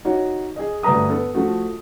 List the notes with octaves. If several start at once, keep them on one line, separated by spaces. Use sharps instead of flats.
D#4 F#4 C#5
G#4 D#5
D2 G2 B4 A#5 D#6
B3 A4
F3 A3 F#4